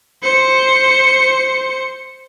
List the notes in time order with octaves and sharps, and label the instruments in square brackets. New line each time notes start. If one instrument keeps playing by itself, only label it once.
[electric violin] C5 C#7